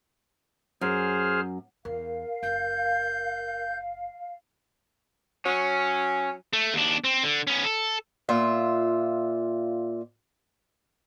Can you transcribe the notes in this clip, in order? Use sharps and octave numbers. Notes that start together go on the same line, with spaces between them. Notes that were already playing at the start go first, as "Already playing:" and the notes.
F#2 G#4 C5 F6
E2 A#4 F5
F#1 G6
F#3 C#4
A3
D#2 D4
C4
D3
B3 C#4
A4
A#2 F4 E5